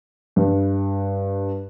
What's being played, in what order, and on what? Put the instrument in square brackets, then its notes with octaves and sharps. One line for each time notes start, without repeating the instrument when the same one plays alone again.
[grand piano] G2